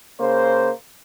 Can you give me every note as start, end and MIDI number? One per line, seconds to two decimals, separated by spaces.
0.19 0.70 49
0.19 0.70 58
0.19 0.70 72